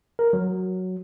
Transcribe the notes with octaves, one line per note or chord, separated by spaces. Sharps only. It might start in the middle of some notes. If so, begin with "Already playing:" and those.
A#4
F#3